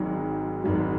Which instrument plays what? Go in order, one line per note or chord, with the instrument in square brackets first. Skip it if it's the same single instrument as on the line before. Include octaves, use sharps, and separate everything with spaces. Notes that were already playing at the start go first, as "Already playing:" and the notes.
Already playing: [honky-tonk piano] G#1 G#2 F#3
G#1 G#2 F#3